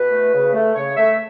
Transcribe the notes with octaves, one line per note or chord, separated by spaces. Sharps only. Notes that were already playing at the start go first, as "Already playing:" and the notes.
Already playing: B2 B4
A3
C#3
A3
C#3 C#5
A3 E5